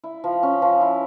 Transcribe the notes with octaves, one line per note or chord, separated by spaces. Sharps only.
E4
F3
C#4
F3
E4